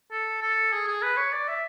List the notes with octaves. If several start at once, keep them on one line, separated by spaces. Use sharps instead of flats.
A4
A4
G#4
G#4
B4
C#5
D5
E5